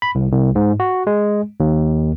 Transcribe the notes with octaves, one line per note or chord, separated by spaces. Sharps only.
B5
C2
C2
G#2
F#4
G#3
D#2